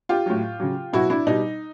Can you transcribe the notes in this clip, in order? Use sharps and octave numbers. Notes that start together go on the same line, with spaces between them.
F4 G4
A2 F#3
C#3 F#3
B2 F#3 E4 F#4
D4 E4
B2 G3 D#4